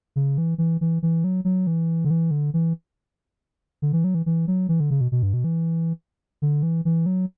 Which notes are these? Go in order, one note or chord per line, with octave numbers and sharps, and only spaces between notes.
C#3
E3
E3
E3
E3
F#3
F#3
E3
D3
E3
D3
E3
D3
E3
F#3
E3
E3
F#3
E3
D3
C#3
B2
B2
G2
B2
E3
D3
E3
E3
F#3